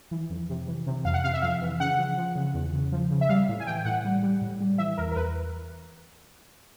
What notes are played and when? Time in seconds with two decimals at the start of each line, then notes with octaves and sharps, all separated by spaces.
0.11 E3
0.30 F2
0.50 C3
0.68 E3
0.87 C3
1.05 F2 F5
1.14 F#5
1.24 C3 F5
1.34 E5
1.42 F2 F5
1.61 E3
1.80 C#3 F#5
1.98 F3
2.17 F3
2.36 C#3
2.54 E2
2.73 C#3
2.92 F3
3.11 C#3
3.21 E5
3.29 G3 F5
3.49 A2
3.60 G#5
3.67 E3 G5
3.85 A2 F#5
4.05 G3
4.23 G3
4.42 A2
4.61 G3
4.78 E3 E5
4.97 E2 A#4
5.12 A#4
5.16 E2 B4